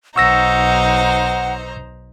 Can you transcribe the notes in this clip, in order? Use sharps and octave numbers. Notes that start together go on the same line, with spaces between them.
B1 D#4 C5 F#5 A#5 C#6 E6 A#6